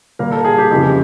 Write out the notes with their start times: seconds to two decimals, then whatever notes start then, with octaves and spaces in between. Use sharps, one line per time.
0.19 A#2 G3 A#3 A#4
0.31 A4
0.45 G#4
0.58 G4
0.71 F2 C#3 E3 G4